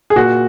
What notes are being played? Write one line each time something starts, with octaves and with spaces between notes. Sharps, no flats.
G#4
A#2 F#4